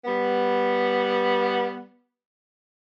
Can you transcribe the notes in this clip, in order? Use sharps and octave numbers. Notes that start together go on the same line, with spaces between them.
G3 B3